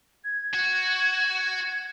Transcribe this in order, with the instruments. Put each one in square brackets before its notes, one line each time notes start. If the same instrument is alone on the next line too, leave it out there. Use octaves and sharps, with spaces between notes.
[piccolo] G#6
[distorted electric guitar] F#4